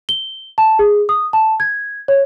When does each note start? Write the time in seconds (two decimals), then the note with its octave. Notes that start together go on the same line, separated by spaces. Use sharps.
0.09 G7
0.58 A5
0.79 G#4
1.09 D#6
1.33 A5
1.60 G#6
2.08 C#5